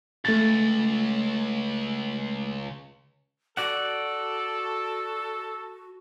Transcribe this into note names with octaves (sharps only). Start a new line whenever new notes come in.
C#2 A3 A6
F#4 A4 D5 F#5